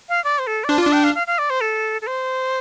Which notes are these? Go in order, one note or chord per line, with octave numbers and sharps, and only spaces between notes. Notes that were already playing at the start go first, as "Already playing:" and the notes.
F5
D5
C5
A4
D5
D4 C5
F4 D5
D4
G5
F5
F5
F5
D5
C5
A4
A4
C5